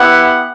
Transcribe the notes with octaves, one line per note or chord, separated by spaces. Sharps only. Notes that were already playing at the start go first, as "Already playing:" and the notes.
Already playing: B3 E4 G4 F#5